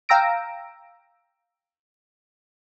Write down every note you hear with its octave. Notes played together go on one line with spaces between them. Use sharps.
F5 G5 A#5 E6 A#6 D7